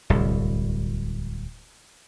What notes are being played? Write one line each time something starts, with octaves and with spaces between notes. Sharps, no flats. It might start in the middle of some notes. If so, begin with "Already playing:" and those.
D1 C2